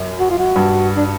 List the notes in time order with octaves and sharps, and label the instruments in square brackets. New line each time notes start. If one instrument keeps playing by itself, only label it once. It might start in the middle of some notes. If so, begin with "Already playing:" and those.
Already playing: [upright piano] F#2
[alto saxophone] F#4
F4
F#4
[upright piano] G2
[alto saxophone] D4